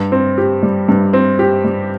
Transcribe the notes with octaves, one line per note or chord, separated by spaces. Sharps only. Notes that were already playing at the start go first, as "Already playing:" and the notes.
Already playing: G2
C4
G4
G3
G2
C4
G4
G3